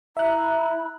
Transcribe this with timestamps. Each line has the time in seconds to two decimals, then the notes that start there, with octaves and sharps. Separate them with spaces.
0.17 E4 E5 A#5 F#6